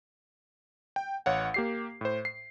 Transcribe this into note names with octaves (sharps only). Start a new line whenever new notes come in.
G5
A1 C#5 F5 F#5
A#3 G4 C7
A2 C5
C7